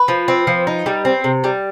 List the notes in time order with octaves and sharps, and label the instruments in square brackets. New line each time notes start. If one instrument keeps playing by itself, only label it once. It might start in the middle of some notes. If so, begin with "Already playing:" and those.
Already playing: [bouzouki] B4
F3
C4
F3
D#4
G3
C4
C3
G3